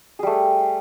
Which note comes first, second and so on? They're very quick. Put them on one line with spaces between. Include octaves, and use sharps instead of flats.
G#4 G3 A3